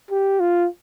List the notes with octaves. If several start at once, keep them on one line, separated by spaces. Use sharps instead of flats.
G4
F4